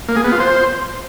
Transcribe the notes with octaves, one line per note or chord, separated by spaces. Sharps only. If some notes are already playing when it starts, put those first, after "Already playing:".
A#3
G#4
B3
F4
C5